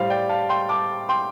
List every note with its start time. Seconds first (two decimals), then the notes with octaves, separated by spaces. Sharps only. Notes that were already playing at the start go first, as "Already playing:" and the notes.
Already playing: A2 G3 C5 F5
0.10 D5 G5
0.29 F5 A5
0.49 G5 C6
0.69 A5 D6
1.09 G5 C6